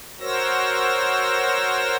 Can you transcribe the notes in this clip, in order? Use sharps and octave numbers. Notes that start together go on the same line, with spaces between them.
F#4 A#4 C5 C#5 E6 A#6